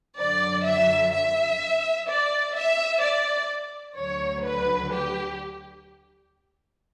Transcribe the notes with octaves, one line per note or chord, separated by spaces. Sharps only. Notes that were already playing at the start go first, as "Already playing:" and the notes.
F#2 D3 F#3 D5
E5
E5
D5
E5
D5
D2 D3 F#3 C#5
B4
G4